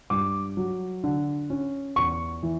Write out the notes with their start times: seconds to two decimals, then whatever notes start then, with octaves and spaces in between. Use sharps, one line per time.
0.10 G2 D6
0.57 F#3
1.04 D3
1.50 C#4
1.96 E2 C#6
2.43 E3